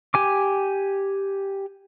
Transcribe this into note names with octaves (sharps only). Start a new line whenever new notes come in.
G4 G#5 D6